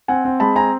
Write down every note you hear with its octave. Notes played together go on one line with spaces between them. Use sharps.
C4 F#5 G#5
C4
G#3 A5 B5
C4 G#5 A#5